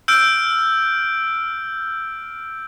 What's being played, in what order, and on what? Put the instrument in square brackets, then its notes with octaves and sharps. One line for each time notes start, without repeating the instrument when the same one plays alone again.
[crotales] E6 F6 G6 D7